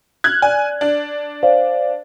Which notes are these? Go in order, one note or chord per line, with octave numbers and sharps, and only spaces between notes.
F6 F#6 G#6
D5 G#5
D4
C5 D5 F5